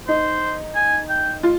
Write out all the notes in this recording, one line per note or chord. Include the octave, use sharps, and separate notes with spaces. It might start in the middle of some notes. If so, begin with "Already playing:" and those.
D#4 C5
G#5
G5
F4